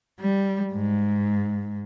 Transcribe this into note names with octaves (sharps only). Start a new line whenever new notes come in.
G3
G#2